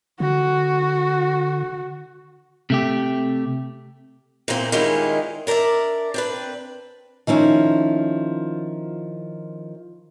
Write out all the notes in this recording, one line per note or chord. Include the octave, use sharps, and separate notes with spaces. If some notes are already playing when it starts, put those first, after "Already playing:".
D3 F#4
C3 A3 G4
A#2 E3 G#3 A#3 C4
D#3 G3 G#3 C#4 E4 F4
D4 A#4 C5 D5 E5
C4 D4 B4
D#3 F3 C#4 E4